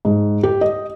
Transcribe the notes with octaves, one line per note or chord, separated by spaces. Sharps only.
G#2
G4
D#5